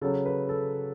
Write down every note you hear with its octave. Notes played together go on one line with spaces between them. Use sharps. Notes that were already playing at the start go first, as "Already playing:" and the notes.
C#3 F#3 A4
B4
A4